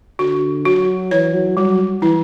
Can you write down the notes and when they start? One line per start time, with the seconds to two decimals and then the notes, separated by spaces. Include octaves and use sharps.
0.19 D3 F#4
0.65 F#3 F#4
1.11 E3 C#5
1.34 F#3
1.57 F#3 G3
2.02 E3 E4